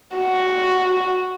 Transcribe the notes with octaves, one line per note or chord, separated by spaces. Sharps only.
F#4